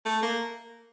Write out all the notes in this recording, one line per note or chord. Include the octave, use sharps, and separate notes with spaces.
A3
A#3